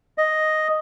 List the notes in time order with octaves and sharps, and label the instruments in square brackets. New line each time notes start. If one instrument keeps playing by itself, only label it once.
[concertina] D#5